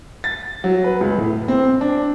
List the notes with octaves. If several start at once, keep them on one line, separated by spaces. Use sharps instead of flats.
A6
F#3
B4
C#2
A2
C4
D4